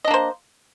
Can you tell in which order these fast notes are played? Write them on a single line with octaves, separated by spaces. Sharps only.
D#5 D4 A#3 C5